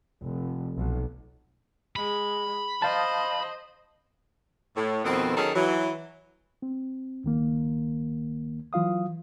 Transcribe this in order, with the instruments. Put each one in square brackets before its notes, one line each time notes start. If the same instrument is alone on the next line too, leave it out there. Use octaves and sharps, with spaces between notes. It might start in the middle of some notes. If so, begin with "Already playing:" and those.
[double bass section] F1
B1
[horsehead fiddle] G#3 [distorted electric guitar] B5
[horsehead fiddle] C5 D#5 [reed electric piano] F5 A5
[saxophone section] A2
F2 B2 D#3 B3 C4
D#3 F#3 C#4 D#4 G#4 A4
E3 F#3
[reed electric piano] C4
C#2 D#3 A#3
E3 F#3 F4 F5 D#6